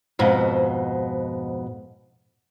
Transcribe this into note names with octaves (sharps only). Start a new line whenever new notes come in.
F2 G#2 B2